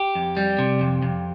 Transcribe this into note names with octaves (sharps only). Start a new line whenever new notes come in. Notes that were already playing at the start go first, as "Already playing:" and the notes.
Already playing: G4
F2
G3
C3
F2
F2